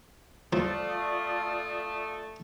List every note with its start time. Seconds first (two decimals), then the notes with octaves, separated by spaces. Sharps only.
0.53 F3 A3 F4 D5 D#6